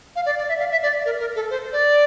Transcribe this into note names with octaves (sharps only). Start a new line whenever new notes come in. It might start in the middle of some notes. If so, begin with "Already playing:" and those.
F5
D5
D5
E5
F5
E5
D5
A#4
A#4
A4
C5
D5